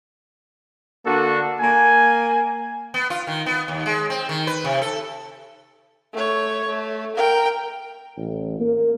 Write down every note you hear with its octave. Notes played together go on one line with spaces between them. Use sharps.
D3 A#3 D4 F#4 A4
A#3 G#5
B3
F4
D#3
B3
D#2
G#3
C4
D#3
B4
C3
A4
A3 C#5
A3
A#4 G5
A1
A#3